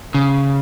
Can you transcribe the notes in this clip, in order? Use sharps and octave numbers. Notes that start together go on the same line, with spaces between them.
C#3